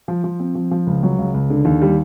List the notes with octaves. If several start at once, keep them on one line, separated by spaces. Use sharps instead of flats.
F3
F3
C4
F3
F3
C#2
F#3
C#2
C#2
D3
D#2
G3